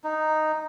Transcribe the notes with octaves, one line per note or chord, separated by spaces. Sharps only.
D#4